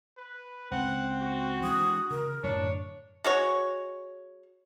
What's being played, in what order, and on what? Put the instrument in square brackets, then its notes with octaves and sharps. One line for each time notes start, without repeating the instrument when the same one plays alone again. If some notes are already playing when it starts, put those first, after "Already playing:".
[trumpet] B4
[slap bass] C#2 [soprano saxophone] C4 [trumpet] F#5
[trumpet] F#4
[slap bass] E3 G#3 D4 [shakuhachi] D#6
[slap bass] C#3 [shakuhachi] A#4
[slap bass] F#2 A2 D3 [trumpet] D4 [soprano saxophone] C#5
[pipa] G#3 F#4 C#5